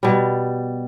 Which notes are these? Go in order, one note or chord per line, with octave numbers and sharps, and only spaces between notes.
B2 G3